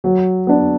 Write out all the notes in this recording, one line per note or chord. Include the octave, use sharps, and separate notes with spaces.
F#3
B3 D4